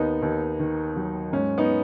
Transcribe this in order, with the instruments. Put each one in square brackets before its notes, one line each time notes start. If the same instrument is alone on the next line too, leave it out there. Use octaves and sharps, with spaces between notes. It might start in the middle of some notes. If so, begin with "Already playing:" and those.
Already playing: [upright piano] D#2 B3 D#4
D#2
D#3
F#3
G#2 C#4
B3 D#4